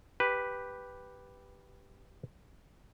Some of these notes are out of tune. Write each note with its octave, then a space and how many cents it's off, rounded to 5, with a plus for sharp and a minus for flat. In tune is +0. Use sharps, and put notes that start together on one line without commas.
G4 +0 B4 +0